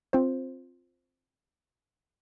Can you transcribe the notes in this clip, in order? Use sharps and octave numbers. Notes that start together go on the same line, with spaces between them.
C4 F4 C5